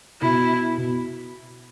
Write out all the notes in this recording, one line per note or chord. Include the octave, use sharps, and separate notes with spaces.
B2 E4
B2